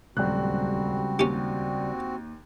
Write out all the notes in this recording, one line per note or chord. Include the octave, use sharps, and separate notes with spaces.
D#1 C#2 F#3 G3 C4 F#4 F#6
D#2 C#4 G4